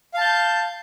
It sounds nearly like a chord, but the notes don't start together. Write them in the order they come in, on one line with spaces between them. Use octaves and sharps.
F5 A5 G6